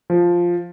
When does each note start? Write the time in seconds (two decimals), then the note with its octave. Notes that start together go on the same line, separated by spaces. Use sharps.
0.10 F3